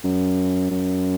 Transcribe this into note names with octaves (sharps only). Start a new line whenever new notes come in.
F#2
F#2